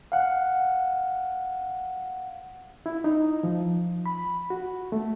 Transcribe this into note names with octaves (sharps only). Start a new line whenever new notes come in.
F5 F#5
E4
D#4
F3
B5
F#4
A3